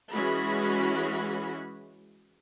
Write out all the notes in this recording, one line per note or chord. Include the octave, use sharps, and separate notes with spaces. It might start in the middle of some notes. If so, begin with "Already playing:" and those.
E3 G#3 C#4 F#4 G#4 B5